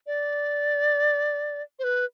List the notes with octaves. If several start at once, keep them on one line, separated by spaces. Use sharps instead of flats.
D5
C5
B4